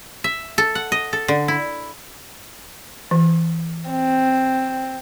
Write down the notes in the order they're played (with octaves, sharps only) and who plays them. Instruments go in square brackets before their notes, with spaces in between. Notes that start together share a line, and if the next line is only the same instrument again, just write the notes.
[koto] E5
A4
F#5
D#5
A4
D3
E4
[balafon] E3
[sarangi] C4